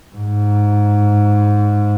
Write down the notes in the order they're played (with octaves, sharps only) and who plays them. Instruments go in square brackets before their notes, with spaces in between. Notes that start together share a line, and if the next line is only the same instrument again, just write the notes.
[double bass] G#2